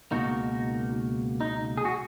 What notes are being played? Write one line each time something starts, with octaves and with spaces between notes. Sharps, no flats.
C#2 B2 A#3 D#4 F#4
D#4
G#4
F#4